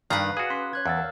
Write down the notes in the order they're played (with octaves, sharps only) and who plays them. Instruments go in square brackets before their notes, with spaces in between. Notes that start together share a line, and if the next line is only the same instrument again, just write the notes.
[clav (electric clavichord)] G2 D#3 [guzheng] B4 A#5 [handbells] D5 F5 C7
[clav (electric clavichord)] F#4 G#4 [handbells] F5 D#6
[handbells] C#4 C6 B6
C#5 F#6 G#6
[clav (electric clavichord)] E2 [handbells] F5 E6 A6
[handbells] A#4